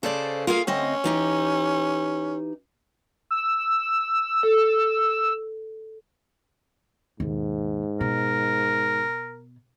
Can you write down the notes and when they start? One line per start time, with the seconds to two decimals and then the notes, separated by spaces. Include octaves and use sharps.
0.03 C#3 A4 C5 D5
0.47 A#3 F4 G#4 F5
0.67 D2 C4 C#4 D#5
1.04 E3 D#4 G4
3.31 E6
4.43 A4
7.20 D#2 G#2 B2
8.01 B2 A#4